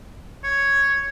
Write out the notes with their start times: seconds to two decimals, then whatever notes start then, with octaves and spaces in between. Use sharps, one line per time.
0.44 C#5